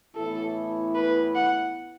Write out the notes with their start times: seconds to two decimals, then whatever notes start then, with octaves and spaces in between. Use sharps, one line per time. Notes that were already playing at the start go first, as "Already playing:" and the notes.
0.15 A2 E3 B3 E4 A4
0.95 B4
1.35 F#5